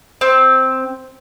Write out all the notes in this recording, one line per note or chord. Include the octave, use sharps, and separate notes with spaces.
C4